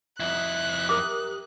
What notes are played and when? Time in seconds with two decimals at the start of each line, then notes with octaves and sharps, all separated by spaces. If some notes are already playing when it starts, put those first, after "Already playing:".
0.20 F2 E4 F#6
0.89 G4 A#4 D6 D#6